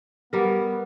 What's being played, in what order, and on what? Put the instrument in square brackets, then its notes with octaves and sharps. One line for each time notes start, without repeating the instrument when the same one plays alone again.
[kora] G3 A#4 [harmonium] B3